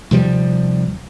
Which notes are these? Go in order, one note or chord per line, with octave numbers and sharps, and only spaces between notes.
D#2 C3 F3 G3